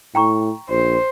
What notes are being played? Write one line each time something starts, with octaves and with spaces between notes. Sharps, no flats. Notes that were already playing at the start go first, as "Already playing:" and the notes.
A2 G5 A#5 C#6
A#1 C5